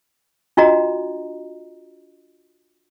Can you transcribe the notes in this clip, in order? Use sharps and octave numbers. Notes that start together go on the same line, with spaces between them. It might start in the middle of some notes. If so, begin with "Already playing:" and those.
D4 F4 F#4 D#5 A#5